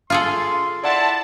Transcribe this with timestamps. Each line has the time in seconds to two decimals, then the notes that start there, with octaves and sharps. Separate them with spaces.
0.10 F4 G#4 A4 C6
0.84 E4 D5 F#5 A5 C6